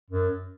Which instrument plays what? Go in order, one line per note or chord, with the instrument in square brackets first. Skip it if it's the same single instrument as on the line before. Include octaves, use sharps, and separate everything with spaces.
[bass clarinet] F#2